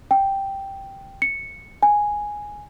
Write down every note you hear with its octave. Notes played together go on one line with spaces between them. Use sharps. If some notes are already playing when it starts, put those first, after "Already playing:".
G5
C#7
G#5